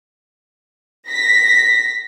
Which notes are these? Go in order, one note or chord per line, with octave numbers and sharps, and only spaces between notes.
A#6 B6